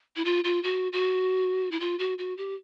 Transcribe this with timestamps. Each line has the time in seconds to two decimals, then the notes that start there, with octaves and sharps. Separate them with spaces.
0.16 E4
0.25 F4
0.44 F4
0.63 F#4
0.92 F#4
1.71 E4
1.80 F4
1.99 F#4
2.18 F#4
2.37 G4